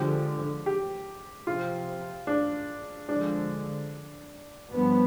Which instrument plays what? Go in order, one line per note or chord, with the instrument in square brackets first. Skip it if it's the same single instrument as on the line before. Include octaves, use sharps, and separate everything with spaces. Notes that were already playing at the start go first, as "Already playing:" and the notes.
Already playing: [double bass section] D3 F3 G#3 [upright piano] G4
[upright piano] G4
[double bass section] C3 F3 C4 [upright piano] F4
[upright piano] D4
[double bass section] D3 F3 G#3 [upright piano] D4
[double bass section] G2 F3 B3